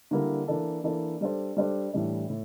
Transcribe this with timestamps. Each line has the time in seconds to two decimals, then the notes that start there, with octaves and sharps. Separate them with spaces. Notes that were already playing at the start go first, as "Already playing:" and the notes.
0.11 D3 G3 A#3 E4
0.48 E3 A#3 D4 A4
0.84 E3 A#3 D4 A4
1.21 G3 D4 A4 C5
1.57 G3 D4 A4 C5
1.93 A2 E3 G3 D4
2.30 A2